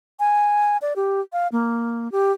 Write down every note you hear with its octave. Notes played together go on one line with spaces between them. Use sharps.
G#5
D5
G4
F5
A#3
G4